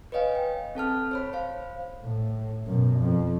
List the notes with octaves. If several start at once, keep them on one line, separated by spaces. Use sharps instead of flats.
B4 C#5 D#5 F5 G#5
G5
C4 A4 A5 F6
C5 C#5 B5
C5 F5
A2
F#2 B2
F2